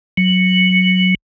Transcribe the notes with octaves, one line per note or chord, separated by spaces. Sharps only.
F#3